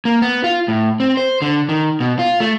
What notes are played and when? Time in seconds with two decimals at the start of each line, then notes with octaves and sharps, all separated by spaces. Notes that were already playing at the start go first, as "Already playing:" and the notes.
0.05 A#3
0.22 B3
0.44 F4
0.68 A2
1.00 C4
1.17 C5
1.42 D3
1.69 D#3
2.00 B2
2.19 F4
2.40 A3